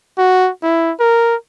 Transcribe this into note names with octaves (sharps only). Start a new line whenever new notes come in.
F#4
E4
A#4